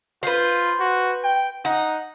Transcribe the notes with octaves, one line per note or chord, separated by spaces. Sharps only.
F4 B4 C5
F#4
G5
D#4 F#5